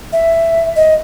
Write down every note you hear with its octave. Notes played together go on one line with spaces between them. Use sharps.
E5
D#5